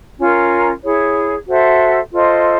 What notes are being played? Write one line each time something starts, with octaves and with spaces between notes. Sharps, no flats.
C#4 F4 A#4
E4 G#4 C#5
F#4 A4 C5 E5
F4 A4 C5 D#5